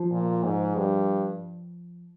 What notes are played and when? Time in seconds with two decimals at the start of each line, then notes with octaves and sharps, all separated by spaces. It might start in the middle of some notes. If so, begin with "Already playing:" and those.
Already playing: F3
0.11 A#2
0.43 G#2
0.76 G2